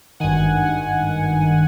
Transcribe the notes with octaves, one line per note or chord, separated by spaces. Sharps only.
G#1 G2 D#3 F#5 G#5